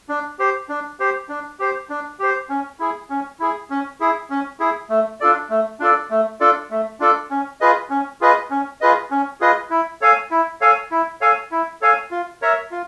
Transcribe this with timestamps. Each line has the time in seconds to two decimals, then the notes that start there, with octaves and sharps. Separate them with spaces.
0.09 D4
0.39 G4 C5
0.69 D4
1.00 G4 C5
1.29 D4
1.59 G4 C5
1.90 D4
2.20 G4 C5
2.49 C#4
2.79 E4 G#4
3.10 C#4
3.40 E4 G#4
3.70 C#4
4.00 E4 G#4
4.30 C#4
4.60 E4 G#4
4.90 A3
5.20 D4 F4 A4 D5
5.50 A3
5.80 D4 F4 A4 D5
6.10 A3
6.40 D4 F4 A4 D5
6.71 A3
7.00 D4 F4 A4 D5
7.31 C#4
7.61 F4 G#4 B4 D#5
7.90 C#4
8.21 F4 G#4 B4 D#5
8.51 C#4
8.81 F4 G#4 B4 D#5
9.11 C#4
9.41 F4 G#4 B4 D#5
9.70 E4
10.01 A4 C#5 F5 G#5
10.31 E4
10.61 A4 C#5 F5 G#5
10.91 E4
11.21 A4 C#5 F5 G#5
11.51 E4
11.81 A4 C#5 F5 G#5
12.11 F4
12.42 A#4 C#5 E5
12.71 F4